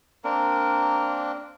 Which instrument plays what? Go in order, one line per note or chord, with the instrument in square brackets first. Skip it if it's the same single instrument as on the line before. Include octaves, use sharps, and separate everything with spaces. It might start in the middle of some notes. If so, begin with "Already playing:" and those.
[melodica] A#3 C4 D4 A#4